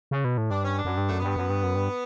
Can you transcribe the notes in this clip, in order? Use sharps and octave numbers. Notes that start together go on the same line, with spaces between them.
C#3
B2
A2
G2 D4
C#4
D4
F#2
G2
F#2 A3
G2 B3
F#2
G2
F#2
G2